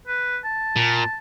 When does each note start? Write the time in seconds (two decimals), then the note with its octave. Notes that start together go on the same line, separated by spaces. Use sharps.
0.07 B4
0.44 A5
0.76 A#2